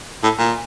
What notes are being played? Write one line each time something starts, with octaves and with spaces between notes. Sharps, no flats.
A2
A#2